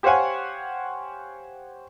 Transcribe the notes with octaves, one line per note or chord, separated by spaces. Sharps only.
G4 C5 C#5 F5 F#5 G#5